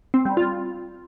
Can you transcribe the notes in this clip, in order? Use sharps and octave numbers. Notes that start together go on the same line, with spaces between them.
C4
G3
F4